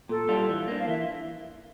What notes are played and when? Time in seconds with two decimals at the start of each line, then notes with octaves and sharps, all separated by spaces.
0.09 A#2 A4
0.29 G3 D4 F4
0.49 E3
0.68 A#3 D4
0.79 F5
0.88 E3 E5